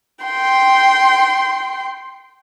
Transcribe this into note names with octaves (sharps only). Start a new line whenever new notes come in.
G5 C6